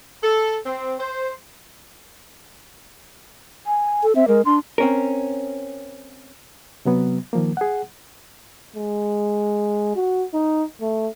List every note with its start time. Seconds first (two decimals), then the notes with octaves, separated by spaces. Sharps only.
0.23 A4
0.66 C4
1.00 C5
3.67 G#5
4.03 A4
4.15 C4 E5
4.28 G#3 A#4
4.45 D4 C6
4.78 C4 C#4 A#4
6.85 C3 F#3 B3
7.33 D#3 F3 A#3
7.57 G#4 F#5
8.76 G#3
9.96 F#4
10.34 D#4
10.81 A3